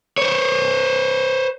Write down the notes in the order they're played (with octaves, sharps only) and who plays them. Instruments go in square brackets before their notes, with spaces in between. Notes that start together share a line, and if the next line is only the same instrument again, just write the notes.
[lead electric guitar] C5 C#5